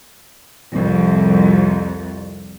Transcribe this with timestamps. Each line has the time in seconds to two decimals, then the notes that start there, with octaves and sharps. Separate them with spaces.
0.73 C2 F2